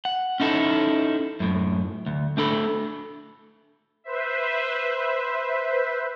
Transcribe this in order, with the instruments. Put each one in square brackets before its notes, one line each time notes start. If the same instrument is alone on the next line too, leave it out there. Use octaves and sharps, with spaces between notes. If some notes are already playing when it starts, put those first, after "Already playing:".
[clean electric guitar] F#5
C#4 D#4 E4 A4
F#2 A2
D2
A3 D4 A4 B5
[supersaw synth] B4 C5 E5